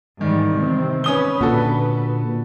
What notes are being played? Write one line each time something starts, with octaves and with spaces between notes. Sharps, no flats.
G#2 D#3 E3 G3
C3 C4
C#4 B4 D#6 G7
A#2 D3 F#4 A4